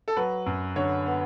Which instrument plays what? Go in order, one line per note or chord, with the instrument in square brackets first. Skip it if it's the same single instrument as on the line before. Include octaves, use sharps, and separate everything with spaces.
[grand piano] A4
F#3 B4
F#2
D3 C#5
B3